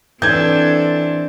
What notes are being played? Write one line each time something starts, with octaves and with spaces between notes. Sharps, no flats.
E3 C4 D4 A4 G6 G#6